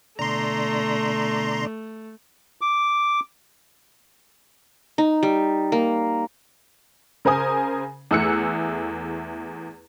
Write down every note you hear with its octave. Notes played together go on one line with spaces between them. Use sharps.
B2 D3 A3 D5 A#5 C6
D6
D#4
G3
A#3
C#3 A#4 C5 G#5 D#6
E2 A3 G#4 E6 F#6 C#7